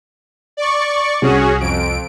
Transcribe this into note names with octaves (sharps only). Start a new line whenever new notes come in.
D5 C#6
C2 C#4 F#4 G#4
F2 D7